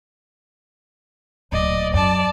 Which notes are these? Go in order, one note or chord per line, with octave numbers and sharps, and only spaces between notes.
D1 A#2 D5 D#5
F#2 D5 A5